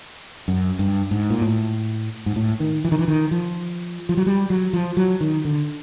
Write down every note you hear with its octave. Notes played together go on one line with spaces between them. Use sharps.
F#2
G2
G#2
A#2
A2
G#2
A2
D#3
E3
D#3
E3
D#3
F3
F3
F#3
G3
F#3
F3
F#3
D#3
D3